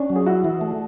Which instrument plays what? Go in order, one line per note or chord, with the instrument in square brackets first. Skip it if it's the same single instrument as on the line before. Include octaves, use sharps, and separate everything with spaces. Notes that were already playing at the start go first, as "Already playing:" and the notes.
Already playing: [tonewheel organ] C#4 [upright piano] D4
[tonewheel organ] F#3
[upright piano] G#4
[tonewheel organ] E4 [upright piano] F#4
[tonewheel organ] E3
A3